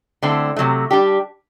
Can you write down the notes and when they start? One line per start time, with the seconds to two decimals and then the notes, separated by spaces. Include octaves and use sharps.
0.23 D3 A3 C4 E4
0.56 C3 F#3 A3
0.91 G3 D4 G4